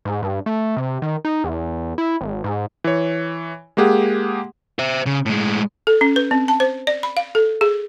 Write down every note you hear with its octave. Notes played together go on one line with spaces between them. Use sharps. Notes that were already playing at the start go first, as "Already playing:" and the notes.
G#2
G2
A3
C3
D#3
D#4
E2
E4
G#1
G#2
E3 C#5
G#3 A#3 G4 G#4 F#5
C5 E5
C#3
A2 G#3
A4
C#4
B4
C4
A5
C5
D5
B5
F5
A4
G#4